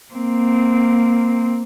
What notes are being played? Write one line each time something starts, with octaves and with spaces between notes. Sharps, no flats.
A#3 C4